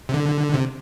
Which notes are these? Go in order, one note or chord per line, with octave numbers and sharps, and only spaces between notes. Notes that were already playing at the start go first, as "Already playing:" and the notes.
C3
D3
C3